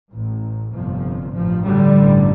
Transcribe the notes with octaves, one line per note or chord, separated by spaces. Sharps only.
A1 A2
G1 F2 C3 F3
A1 G2 F3
D3 G3
A1 G2